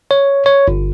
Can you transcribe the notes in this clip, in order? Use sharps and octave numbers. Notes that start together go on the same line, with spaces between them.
C#5
C#5
G1